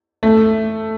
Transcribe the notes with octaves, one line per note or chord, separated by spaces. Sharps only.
A3